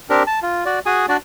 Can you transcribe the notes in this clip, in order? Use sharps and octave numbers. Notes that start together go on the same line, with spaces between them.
C4 D4 G4 A#4
A5
F4
F#4 D5
F#4 G#4 G#5 D#6
D4 F#4 D5